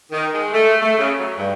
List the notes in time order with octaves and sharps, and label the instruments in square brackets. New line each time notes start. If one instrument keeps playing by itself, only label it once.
[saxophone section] D#3
G#3
A3
A3
C#3
F#3
G2